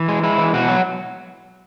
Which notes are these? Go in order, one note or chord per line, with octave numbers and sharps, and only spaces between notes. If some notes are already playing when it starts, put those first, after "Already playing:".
Already playing: E3
G#3
G#3 E4
E3
B2 F#4
F#3